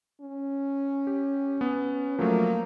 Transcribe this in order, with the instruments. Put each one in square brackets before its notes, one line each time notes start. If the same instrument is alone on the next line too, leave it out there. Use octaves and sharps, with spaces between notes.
[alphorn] C#4
[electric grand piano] G4
B3
[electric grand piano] F3 F#3 A3 [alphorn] A#3